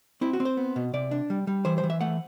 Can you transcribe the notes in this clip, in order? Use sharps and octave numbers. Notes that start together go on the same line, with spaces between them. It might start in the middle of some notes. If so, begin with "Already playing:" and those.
C4 E4
F#4
C4
C5
B3
B2
C3 D5
D4
G3
G3
E3 C5
C5
E3
E5
A3 F#5